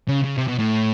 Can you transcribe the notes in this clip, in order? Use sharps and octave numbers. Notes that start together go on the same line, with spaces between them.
C#3
C#3
C3
B2
A2